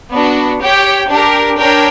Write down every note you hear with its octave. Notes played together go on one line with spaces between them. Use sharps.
B3 D4 F#4
G4 C#5 G5
D4 G4 A#4
D4 A#4 C#5 G5